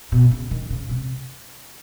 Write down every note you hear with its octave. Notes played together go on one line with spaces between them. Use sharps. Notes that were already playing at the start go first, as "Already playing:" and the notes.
B2
C#3
D#3
C#3
C3